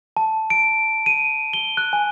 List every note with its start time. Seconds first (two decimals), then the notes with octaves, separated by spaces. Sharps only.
0.17 A5
0.50 D7
1.06 D#7
1.53 G7
1.77 F#6
1.93 G#5